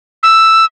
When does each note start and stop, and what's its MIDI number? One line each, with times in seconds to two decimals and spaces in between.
0.23 0.65 88